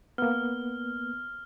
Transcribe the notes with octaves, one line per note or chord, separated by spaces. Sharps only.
A#3 B3 F6